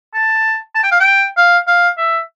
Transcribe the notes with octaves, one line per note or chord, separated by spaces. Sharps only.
A5
A5
G5
F5
G5
F5
F5
E5